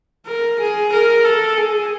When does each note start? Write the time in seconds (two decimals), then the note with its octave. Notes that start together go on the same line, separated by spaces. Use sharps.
0.26 A#4
0.60 G#4
0.93 A#4
1.25 A4
1.57 G#4